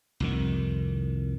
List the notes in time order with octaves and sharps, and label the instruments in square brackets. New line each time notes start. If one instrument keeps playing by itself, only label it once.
[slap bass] C2 F2 D#3